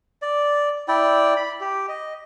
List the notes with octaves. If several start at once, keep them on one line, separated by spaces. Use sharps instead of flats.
D5
E4 D5 G5
B5
G4
D#5